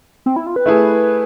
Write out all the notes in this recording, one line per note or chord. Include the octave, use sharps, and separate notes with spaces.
C4
E4
F4
B4
A3 E4 G#4